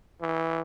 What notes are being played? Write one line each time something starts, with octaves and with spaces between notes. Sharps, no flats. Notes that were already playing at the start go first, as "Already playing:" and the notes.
E3